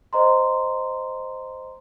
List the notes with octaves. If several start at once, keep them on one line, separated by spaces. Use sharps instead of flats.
C5 D#5 A#5 C6